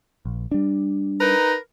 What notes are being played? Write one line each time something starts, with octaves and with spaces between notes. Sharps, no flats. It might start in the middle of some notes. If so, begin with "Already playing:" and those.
A#1
G3 D4
D#4 A#4 B4